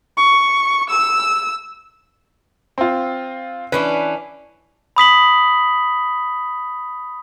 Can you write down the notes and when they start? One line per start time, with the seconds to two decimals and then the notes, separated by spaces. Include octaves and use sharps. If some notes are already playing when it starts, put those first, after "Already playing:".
0.17 C#6
0.89 E6
2.78 C4 F4
3.72 E3 C#4 D4 B4
4.96 B5 D#6 B6 F#7